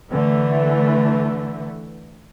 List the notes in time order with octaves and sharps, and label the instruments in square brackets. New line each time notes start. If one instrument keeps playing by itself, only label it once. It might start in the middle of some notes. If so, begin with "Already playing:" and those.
[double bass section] D3 E3 A3